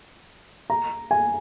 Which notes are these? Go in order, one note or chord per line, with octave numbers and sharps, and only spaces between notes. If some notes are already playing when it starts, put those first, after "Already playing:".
A#5
G#5